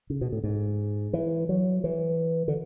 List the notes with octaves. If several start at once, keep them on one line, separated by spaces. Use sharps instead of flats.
C#3
B2
A2
G#2
E3
F#3
E3
D3